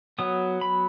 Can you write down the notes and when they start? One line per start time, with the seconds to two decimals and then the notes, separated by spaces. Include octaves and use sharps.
0.19 F#3 B3 D#6
0.61 B5